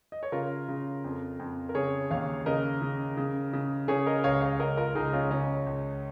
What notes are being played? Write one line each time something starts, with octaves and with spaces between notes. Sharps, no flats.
D#5
C#5
C#3 F4 A#4
C#3
F2
F2
A#4
C#3 G#4 C#5
D#2 C#5 F5
C#3 A#4 D#5
C#3
C#3
C#3
C#3 G#4 C#5
A#4 D#5
C#2 C#5 F5
C#5 F5
C#2 A#4 D#5
F4 A#4
C#2 D#4 G#4
C#4 F4
C#3 C#4
C#2